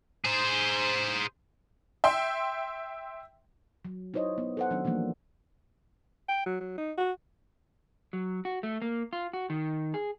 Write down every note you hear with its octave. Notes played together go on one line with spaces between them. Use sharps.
G#4 C5
E5 G5 C6
F#3
D#4 E4 C5 C#5 D#5
B3
A4 C5 F#5
D#3 F#3 B3 C#4 D4
E3 F3 G3 A#3 D4
G5
F#3
F#3
D#4
F#4
F#3
F#4
A3
A#3
F4
F#4
D#3
G#4